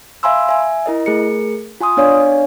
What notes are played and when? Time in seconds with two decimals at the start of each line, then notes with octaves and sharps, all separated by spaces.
0.23 E5 F5 G#5 B5 C6 E6
0.49 E5 G#5
0.86 E4 A#4 D#5
1.06 A3 G#4 A#4 C#7
1.81 F4 G#5 C6 D#6
1.97 B3 D4 C#5 D5 F5 G#5